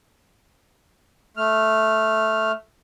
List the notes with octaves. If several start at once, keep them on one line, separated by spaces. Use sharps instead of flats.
A3 F6